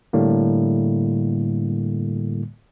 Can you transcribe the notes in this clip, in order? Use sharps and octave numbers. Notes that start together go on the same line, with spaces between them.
A2 D3 G3 A#3